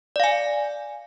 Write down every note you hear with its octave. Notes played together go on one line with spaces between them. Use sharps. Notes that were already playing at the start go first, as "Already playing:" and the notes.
D5 F5 G#5